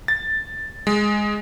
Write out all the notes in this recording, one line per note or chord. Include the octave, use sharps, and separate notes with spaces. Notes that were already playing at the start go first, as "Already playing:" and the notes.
A6
G#3